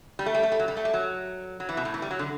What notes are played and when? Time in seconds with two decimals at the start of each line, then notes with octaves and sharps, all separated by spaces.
0.19 G3
0.26 A3
0.34 G3
0.43 A3
0.52 G3
0.59 F#3
0.68 G3
0.77 A3
0.85 G3
0.94 F#3
1.60 F#3
1.69 E3
1.77 B2
1.85 A2
1.94 E3
2.02 G3
2.11 F#3
2.19 D3